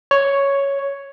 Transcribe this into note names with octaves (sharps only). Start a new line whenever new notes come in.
C#5